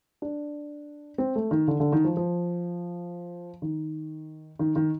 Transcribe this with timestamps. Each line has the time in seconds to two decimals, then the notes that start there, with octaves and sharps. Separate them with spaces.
0.22 D4
1.18 C4
1.35 A3
1.51 D#3
1.68 D3
1.80 D3
1.92 D#3
2.04 F3
2.17 F3
3.62 D#3
4.59 D#3
4.76 D#3